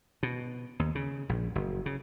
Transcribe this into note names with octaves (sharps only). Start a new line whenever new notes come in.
B2
D#2
C#3
A#1
F#1
C#3